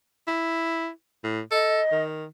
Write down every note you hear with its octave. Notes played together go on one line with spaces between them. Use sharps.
E4
A2
A4 D#5
D#3